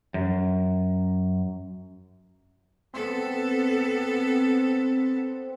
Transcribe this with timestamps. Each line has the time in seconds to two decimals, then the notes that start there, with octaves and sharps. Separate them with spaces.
0.14 F#2
2.94 B3 C4 A4